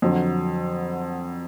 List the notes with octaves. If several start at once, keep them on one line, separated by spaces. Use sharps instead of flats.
F2 D3 F#3